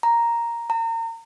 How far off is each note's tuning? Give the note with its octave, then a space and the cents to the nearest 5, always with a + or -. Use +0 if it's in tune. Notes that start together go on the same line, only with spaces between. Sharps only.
A#5 +0
A#5 -35